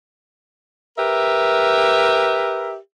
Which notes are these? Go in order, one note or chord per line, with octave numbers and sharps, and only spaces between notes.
G4 A#4 B4 E5